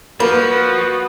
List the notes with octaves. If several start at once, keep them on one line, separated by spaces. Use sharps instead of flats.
F3 A#3 F#4 B4